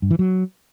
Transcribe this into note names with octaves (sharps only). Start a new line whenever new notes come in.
G2
E3
F#3